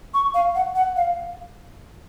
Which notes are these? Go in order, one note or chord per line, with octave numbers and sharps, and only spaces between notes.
C#6
F5
F#5
F#5
F5